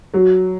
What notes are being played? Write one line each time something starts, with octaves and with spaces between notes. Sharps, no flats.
F#3